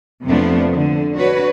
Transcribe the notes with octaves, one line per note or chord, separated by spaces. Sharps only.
F2 C3 F3 A3 B3 D4
D3
D4 F#4 B4 C#5